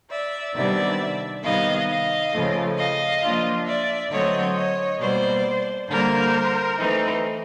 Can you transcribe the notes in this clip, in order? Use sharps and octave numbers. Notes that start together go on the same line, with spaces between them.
D5 E5
C3 D#3 G3 B3 D4 D5 E5
C3 D#3 G3 B3 D#5 F5
D#5 F5
C#3 F3 A3
D#5 F5
F3 A#3 D4 F4
D5 E5
D3 F#3 A3 C4 C#5 D#5
C#5 D#5
B2 G3 A#3 C5 D5
D3 G3 A#3 A#4 C5
E3 A3 C4 D#4